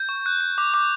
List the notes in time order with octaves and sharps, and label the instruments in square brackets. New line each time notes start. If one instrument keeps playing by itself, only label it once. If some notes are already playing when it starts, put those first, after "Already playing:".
Already playing: [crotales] G6
C#6
F#6
F#6
D6
D6